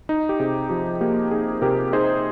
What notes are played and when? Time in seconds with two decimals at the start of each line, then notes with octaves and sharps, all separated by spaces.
0.09 D#4
0.29 G4
0.39 C3 G#4
0.69 F3 G4
1.01 A#3 G4
1.31 D#4 G#4
1.62 C3 G4 A#4
1.93 D#4 G#4 C5